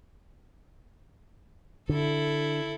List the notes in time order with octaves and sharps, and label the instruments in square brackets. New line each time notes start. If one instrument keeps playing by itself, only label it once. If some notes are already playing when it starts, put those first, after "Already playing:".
[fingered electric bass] D3 [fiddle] E4 A4